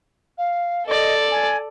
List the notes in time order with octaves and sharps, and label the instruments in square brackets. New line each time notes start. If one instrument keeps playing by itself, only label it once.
[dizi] F5
[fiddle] A4 D5 [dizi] D#5
[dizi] G#5